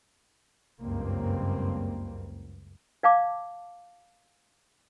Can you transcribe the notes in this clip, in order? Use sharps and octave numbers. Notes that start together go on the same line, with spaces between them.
F#1 C#2 G2 A#3 C4
D5 F5 A5 D6